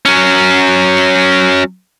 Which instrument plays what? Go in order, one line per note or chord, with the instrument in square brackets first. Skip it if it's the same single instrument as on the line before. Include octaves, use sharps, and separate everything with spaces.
[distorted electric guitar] F#3 C#4